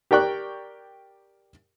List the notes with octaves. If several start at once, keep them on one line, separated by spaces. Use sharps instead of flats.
G4 A#4 D5 G5 C#6 F#6